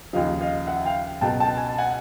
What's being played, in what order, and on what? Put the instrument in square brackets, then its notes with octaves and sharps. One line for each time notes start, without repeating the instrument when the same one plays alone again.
[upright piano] D#2 C#3 F3 D#5 F5
D#5 F5
E5 F#5
F5 G5
C#2 B2 F#3 G5 A5
G5 A5
G#5
A5
F#5 G#5